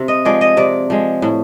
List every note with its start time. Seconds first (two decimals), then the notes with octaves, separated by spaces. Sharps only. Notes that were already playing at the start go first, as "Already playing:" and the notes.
Already playing: C3
0.08 D#5
0.25 F3 G#3 D5
0.41 D#5
0.57 C3 D5
0.90 F3 G#3
1.22 A2